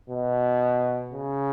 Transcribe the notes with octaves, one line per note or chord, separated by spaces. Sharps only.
B2
C#3